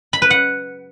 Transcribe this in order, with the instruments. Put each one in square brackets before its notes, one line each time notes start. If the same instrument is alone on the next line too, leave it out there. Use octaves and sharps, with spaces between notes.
[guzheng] B5
B4
F#5